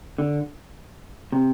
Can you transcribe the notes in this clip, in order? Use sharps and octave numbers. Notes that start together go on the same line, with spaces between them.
D3
C3